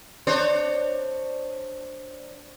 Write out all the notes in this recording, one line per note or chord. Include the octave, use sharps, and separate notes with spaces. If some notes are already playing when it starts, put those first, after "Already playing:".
D4 C5 C#5